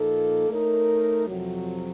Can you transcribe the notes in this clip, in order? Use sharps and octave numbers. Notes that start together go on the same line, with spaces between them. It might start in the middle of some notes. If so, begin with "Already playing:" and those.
Already playing: A#2 F3 A#3 D#4 A4
A3 D#4 A#4 C#5
F2 C3 F#3